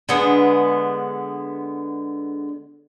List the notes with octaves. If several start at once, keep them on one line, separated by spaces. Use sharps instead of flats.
D3 G#3 B3